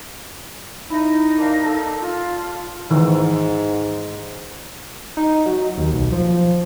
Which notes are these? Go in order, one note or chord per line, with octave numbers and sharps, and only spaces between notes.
D#4 E4
A#3 D4 F5
A4 E6
F4
G#2 D#3 E3
D#4
F#3
D#2
B1
F3